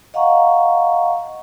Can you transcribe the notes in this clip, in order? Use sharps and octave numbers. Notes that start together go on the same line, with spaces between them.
D#5 F5 F#5 A#5 C#6